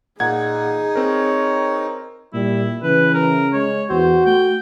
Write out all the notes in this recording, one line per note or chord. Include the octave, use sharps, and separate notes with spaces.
A#2 D#4 G#4 F#5 G#6
C4 A#4 C#5
A#2 G3 E4
C#3 E3 B4
A#4
G#3 C#5
E2 F#4 C5
A3 G5